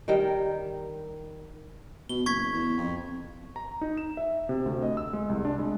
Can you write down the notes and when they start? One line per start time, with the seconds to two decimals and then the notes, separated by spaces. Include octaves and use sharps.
0.08 D#3 G3 A#4 G5
2.09 B2 G7
2.26 F#1 C#6 G#6 B6
2.54 E2
2.78 F2
3.56 A#5
3.81 D#4
3.97 E7
4.17 E5
4.49 C3
4.66 D2
4.83 D#5
4.97 E6
5.13 G#3
5.29 C2
5.45 D4
5.59 G#3